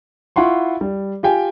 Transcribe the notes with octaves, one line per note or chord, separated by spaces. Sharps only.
E4 F4 F#5 C6 C#6
G3
F4 G4 G5 G#5